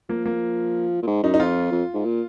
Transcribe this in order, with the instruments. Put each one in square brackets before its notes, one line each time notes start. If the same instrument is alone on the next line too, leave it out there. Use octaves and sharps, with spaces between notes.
[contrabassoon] F3 [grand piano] A#3
[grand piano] A#3
[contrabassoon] A#2
G#2
[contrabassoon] F#2 [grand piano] D#4
[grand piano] D#4
[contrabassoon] F2 [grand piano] F4
[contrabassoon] F2
G#2
A#2